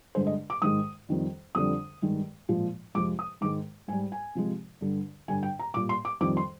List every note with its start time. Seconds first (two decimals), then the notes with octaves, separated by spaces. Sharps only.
0.15 G2 D3 G#3 C5
0.27 D#5
0.50 D6
0.62 G#2 D#3 G#3 D#6
1.09 F2 D#3 G3
1.55 F2 D3 G3 D#6
2.02 G2 D#3 G#3
2.49 A#2 F3 G#3
2.95 F2 C3 F3 G#3 D6
3.19 D#6
3.41 G#2 D#3 G#3 D6
3.88 G#2 G#5
3.92 G3
4.12 G#5
4.35 C3 F3 G#3
4.81 G2 D3 G3
5.28 G2 D3 G3 G#5
5.43 G5
5.59 A#5
5.74 A#2 G3 D6
5.89 C6
6.05 D6
6.20 F2 D#3 G3 D6
6.37 C6